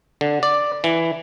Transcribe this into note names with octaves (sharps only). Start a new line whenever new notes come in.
D3
D5
E3